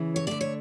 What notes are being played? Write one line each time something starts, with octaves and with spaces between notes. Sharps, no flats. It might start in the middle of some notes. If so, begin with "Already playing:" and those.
Already playing: C#3 E3
C#5
D3 A3 D5
C#5